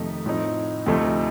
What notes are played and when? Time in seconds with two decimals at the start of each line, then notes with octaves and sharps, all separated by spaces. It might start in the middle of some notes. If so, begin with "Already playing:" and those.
Already playing: F2 C3 D#3 A3 D#4
0.26 A2 F3 C4 D#4
0.86 D2 C3 F3 A3 D#4